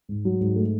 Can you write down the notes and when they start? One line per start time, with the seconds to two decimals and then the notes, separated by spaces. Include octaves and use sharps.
0.09 G#2
0.25 F#3
0.40 G#2
0.56 A3